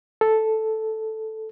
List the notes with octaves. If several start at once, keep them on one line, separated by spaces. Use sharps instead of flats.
A4